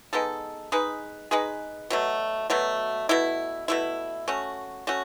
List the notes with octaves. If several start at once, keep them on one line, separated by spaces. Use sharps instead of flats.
G#3 B3 D#4 A4
G#3 D#4 G#4 B4
G#3 D#4 G#4 B4
B2 F#3 A3
B2 F#3 A3
B2 A3 E4
B2 A3 E4
A3 C#4 F#4
A3 C#4 F#4